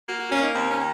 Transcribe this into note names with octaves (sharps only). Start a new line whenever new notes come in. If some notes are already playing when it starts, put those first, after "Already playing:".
A#3 F#4
F#4
A#3 C#4
D#4
D#2 C4
C#4
D#3